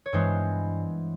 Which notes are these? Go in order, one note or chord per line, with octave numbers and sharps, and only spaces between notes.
C#5
G2 E3 G#3 B3 C5